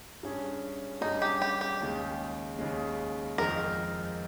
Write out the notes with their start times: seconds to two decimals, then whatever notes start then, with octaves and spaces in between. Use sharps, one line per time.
0.23 G2 G3 C#4 G#4
1.01 G2 G3 C#4 D#4 G#4
1.22 G4
1.42 G4
1.61 G4
1.81 D#2 C#3 G#3
2.59 D#2 C#3 G#3
3.38 F2 D#3 G#3 C4 D#4 A#4